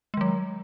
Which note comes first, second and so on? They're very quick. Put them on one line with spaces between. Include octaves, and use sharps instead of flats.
G#3 D#3 F#3